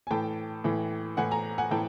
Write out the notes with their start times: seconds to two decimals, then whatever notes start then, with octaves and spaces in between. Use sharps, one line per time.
0.07 G#5
0.11 A2 E3 G5 A5
0.64 A2 E3
1.17 A2 E3 F#5 G#5
1.31 G#5 A#5
1.58 F#5 G#5
1.71 A2 E3 G5 A5